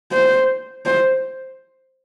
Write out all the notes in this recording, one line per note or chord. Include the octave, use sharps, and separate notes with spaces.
C5
C5